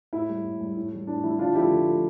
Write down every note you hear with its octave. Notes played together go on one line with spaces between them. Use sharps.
A2 E4
G3
A2
G3
A2
E3 G3
A2 D4
E3 G3 E4
D3 D4 F4
F3 A3 E4 G4
D3
F3 A3